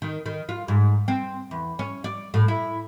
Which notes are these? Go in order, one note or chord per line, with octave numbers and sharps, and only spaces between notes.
D#3
D#3
F4
G#2
C4
E2
C#4
D5
A2
E4